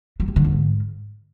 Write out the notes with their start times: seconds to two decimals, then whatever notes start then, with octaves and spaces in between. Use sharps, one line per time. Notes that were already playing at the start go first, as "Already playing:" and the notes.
0.20 F#3
0.28 G3
0.36 D3
0.44 F2
0.52 G#2